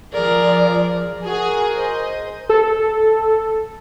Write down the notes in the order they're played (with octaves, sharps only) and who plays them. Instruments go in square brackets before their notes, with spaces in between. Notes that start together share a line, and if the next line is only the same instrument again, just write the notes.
[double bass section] F3 [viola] G#4 A#4 [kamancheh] D5
[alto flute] F#4 [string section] G#4 [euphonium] A#4
[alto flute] C5 [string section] D#5
[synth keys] A4